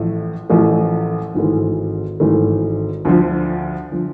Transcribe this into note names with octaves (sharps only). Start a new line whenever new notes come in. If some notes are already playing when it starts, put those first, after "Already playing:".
Already playing: A1 A2 F3 A3
A1 A2 F3 A3
G#1 G#2 E3 A3
G#1 G#2 E3 A3
D2 D3 F3
D3 F3